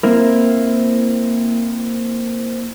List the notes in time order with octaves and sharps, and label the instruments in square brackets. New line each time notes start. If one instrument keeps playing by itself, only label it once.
[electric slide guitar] A#3 C4 E4 A#4